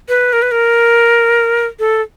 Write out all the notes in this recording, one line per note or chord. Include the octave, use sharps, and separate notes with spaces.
B4
A#4
B4
A#4
A4